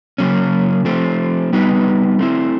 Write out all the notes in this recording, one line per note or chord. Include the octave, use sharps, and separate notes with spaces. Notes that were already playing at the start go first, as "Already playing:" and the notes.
C#3 F#3 A#3 C#4
F3 A3 C4
G3 B3 D#4 F#4 B4
A3 C4 E4